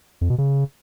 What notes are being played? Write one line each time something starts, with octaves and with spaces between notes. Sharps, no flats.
F2
B2
C#3